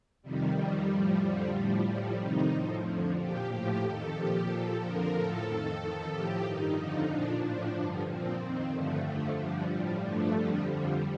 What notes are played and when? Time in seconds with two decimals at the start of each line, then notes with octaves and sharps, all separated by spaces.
0.22 F2 C3 D#3 G3
0.55 F2 D#3 G3
0.88 A2 F3
1.20 F2 D3 F3
1.53 A2 F3 G3
1.86 A2 F3
2.18 F2 C3 D#3 D#4
2.52 A2 F3
2.84 F2 D3 F3
3.16 A#2 F3 G4
3.49 A2 F3 G4
3.82 F2 D#3 A4
4.14 A#2 F3 G4
4.47 A#2 F3 A4
4.80 F2 D3 F3 A#4
5.12 A2 F3 A4
5.45 F2 D#3
5.77 F2 D#3
6.10 A2 F3 G4
6.43 G2 D#3 D#4
6.75 F2 D3 F3 D#4
7.08 A#2 F3 D4
7.41 A2 F3 D4
7.73 G2 D3 F3
8.06 A#2 F3 C4
8.39 F2 D#3 C4
8.72 G2 D3 F3 A3
9.04 F2 D3 F3 A3
9.37 G2 D3 F3 G3
9.69 A2 F3
10.02 G2 D3 F3 A3
10.35 F2 D3 F3 G3
10.67 F2 D3 F3 G3